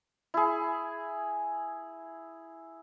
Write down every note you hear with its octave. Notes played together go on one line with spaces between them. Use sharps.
E4 G#4